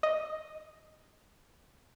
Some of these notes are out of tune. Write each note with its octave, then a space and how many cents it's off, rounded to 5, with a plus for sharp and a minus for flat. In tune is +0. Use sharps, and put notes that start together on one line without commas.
D#5 +0 D#6 +0